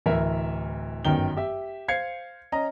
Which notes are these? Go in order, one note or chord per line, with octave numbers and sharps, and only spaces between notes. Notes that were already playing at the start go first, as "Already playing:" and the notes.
D1 E3 A#4 E5
G1 F#2 D#3 G5 G7
G4 E5
C5 F5 G#6 C7 C#7
C#4 D#5 A#5